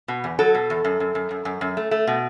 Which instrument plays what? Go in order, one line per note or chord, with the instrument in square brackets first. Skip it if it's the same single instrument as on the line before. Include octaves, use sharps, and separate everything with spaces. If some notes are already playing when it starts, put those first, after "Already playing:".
[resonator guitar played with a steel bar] B2
E2
F#3 A4
B2
E2
F#2
F#2
F#2
F#2
F#2
F#2
A3
A3
B2